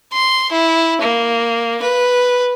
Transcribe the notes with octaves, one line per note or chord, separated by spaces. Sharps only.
C6
E4
A#3
B4